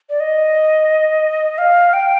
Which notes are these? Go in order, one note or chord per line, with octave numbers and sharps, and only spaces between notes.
D5
D#5
F5
G5